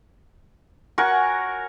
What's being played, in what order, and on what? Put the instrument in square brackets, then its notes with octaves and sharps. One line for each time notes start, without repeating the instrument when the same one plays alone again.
[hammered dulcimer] F#4 C#5 G#5 [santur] A#4 F#5 C#6